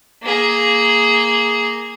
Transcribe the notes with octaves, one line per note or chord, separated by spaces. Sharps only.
A#3 G#4